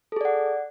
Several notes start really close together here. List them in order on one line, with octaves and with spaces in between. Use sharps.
A4 G#4 D5 F#5